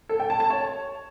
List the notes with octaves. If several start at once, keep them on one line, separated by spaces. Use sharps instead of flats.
A4
G5
A5
A5
C#5